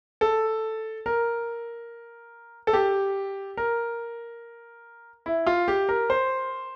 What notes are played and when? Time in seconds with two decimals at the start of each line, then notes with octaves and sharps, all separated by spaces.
0.21 A4
1.06 A#4
2.67 A4
2.73 G4
3.57 A#4
5.26 E4
5.47 F4
5.68 G4
5.89 A#4
6.10 C5